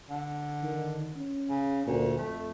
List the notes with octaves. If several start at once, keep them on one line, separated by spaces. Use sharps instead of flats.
D3
D#3
C#4
C#3
D2 A#2
F2 A3